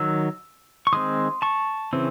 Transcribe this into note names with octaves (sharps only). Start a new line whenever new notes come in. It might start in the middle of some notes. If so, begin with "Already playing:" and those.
Already playing: D#3 F#3 E6
C#6
D#3 G#3 C4 C6 D#6
A5 C#6
C#3 E3 C4